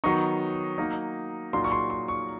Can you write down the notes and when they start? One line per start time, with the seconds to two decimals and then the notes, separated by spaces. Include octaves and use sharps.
0.04 D#3 F#3 B3 D#4 C#6
0.78 F#3 A#3 D#4
1.53 A#2 F#3 A#3 D#4 C6
1.64 C#6
1.72 C6
1.90 C6
2.08 C#6